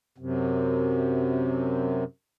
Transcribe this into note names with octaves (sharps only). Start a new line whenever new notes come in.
F#2 C3